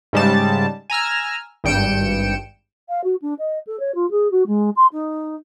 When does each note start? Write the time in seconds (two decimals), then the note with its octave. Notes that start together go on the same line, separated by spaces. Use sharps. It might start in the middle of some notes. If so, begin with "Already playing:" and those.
0.13 G#2 C#3 G3 G#3 A5
0.90 G#5 A#5 E6 F6
1.64 G#1 G2 G5 C#7 D7 E7
2.89 F5
3.04 F#4
3.22 D4
3.39 D#5
3.67 A4
3.80 C#5
3.95 F4
4.11 G#4
4.31 F#4
4.47 G#3
4.76 C6
4.93 D#4